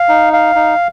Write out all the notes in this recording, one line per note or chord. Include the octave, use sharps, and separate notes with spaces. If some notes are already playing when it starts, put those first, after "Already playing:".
Already playing: F5
D#4
F5
D#4